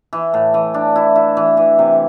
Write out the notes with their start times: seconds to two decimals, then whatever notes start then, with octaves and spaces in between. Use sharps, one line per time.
0.13 E3
0.34 A2
0.54 E3
0.74 D4
0.96 E4
1.16 E4
1.37 E3
1.57 E3
1.79 C3